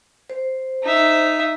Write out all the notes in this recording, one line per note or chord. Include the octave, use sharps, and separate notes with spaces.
C5
D#4 E5